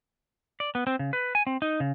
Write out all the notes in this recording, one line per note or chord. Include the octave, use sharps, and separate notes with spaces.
D5
B3
C4
C#3
B4
G#5
C4
D#4
C#3